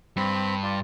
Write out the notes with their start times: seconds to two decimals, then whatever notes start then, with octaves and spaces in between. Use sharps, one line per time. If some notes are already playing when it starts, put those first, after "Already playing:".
0.17 G2 C4 B5
0.63 F4 D5